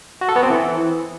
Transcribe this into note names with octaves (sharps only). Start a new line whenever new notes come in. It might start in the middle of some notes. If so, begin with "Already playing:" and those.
F#4
A4
B3
C4
E3